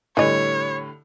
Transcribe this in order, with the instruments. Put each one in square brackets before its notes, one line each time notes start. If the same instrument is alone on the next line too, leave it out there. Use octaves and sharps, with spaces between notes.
[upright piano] A2 D3 G3 [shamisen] E3 D#5 [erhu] C#5